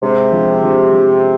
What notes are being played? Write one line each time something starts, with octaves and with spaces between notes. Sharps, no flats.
C3 G#3
F3
F3
F3